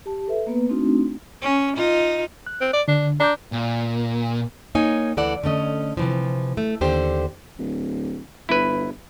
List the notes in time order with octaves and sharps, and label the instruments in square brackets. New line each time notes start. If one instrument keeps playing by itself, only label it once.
[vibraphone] G4 A5
A4 B4 E5
A#3 B3 B4
A3 C4 D4 D#4 F#4
[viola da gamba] C#4
D#4 F4
[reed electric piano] F#6
[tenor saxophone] C4
D5
[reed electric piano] D3 [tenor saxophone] D4
[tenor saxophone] D4 [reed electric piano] A#5 D6 G6
[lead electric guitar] A#2
[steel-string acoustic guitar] A#3 D#4 C#5 G#5
D2 E3 A4 D5 F#5
D3 A3 C#4 D#5
C3 E3 F3
A3
D#2 D3 G4 C5
[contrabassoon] D1
[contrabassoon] G1 [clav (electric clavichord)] E4 B4